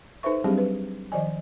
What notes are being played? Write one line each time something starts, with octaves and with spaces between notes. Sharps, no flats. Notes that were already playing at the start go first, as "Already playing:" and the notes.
D#4 A4 B4 C5 E5 C#6
F#3 G3 C4 D4 G4 G#4
B4
D#3 F3 D5 D#5 G#5